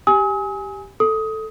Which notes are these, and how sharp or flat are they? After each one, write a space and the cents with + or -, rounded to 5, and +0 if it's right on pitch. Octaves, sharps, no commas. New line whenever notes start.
G4 +0 G#5 +0 D#6 +45
A4 +0 D#6 +15